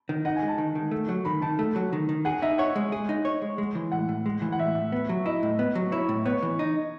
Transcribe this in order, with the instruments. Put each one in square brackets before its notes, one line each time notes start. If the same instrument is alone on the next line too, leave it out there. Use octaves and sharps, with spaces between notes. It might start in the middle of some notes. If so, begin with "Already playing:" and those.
[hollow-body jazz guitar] D#3
[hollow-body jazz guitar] D#4 [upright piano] F#5
[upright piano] G#5
[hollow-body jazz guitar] G#3
[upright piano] A5
[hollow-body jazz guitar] D#3
D#3
A3
F#3
[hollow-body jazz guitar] D#3 [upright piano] B5
[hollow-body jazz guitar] D#3 [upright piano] A5
[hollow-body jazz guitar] A3
F#3
D#3
D#3
[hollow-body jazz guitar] G#4 [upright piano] F#5
[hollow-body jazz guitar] D#4 [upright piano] E5
[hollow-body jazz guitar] C#5 [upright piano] F#5
[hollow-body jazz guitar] G#3
G#4
D#4
C#5
G#3
G#3
E3
[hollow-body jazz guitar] A2 [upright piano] F#5
[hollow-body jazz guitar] A2
G#3
E3
[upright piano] F#5
[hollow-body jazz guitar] A2 [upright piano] E5
[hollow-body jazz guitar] A2
B3
F#3
[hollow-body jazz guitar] E4 [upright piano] D#5
[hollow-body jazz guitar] A2
B3
F#3
[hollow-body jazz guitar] E4 [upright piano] C#5
[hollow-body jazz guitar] A2
[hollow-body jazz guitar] B3 [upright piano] C#5
[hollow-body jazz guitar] E3
D#4